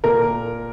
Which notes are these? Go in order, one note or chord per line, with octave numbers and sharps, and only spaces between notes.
A#2 A#4